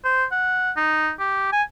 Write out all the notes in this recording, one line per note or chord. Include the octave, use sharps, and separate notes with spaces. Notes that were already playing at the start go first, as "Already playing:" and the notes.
C5
F#5
D#4
G4
G#5